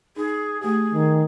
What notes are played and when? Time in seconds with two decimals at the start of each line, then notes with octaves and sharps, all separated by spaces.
0.16 D#4 G#4
0.61 A3 G4 G#4
0.93 D#3